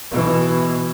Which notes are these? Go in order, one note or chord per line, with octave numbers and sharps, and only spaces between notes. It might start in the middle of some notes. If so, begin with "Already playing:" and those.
B2 E3